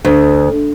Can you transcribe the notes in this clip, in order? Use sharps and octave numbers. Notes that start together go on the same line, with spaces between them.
D2